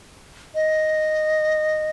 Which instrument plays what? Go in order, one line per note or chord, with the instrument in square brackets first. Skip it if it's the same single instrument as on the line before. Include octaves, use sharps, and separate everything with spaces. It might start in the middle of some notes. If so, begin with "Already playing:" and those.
[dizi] D#5